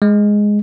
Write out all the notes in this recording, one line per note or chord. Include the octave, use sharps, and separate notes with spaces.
G#3